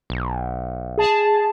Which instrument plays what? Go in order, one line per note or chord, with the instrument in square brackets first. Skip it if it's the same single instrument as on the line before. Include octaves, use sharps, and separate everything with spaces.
[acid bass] B1
[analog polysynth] G#4 A5